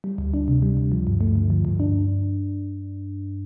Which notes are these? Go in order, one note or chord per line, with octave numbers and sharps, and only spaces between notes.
G3
D2
D4
C3
G3
D2
F3
G2
A3
D3
F3
G2
D4